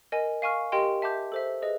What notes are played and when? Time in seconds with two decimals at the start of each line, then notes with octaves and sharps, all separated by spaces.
0.12 A#4 D#5 G#5
0.42 F5 G#5 C#6 F6
0.72 G4 A#4 D#5 G5 C6
1.02 E5 A5 D6 G6
1.32 A4 C5 E5
1.62 G#4 B4 D#5